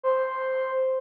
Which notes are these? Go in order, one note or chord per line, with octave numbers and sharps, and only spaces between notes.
C5